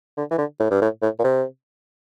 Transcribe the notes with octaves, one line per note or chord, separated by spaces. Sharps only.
D3
E3
D3
A2
G2
A2
A2
A#2
C3